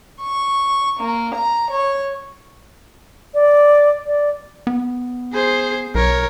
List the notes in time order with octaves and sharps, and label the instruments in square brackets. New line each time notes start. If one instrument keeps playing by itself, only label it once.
[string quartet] C#6
A#3
A#5
C#5
[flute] D5
D5
[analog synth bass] B3
[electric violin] G#4 C5
[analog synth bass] B1 [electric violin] A#4 C#5